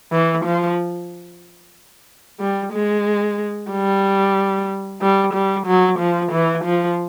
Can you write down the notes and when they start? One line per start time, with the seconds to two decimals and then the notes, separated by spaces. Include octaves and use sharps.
0.12 E3
0.45 F3
2.40 G3
2.73 G#3
3.71 G3
5.01 G3
5.34 G3
5.66 F#3
5.99 F3
6.32 E3
6.65 F3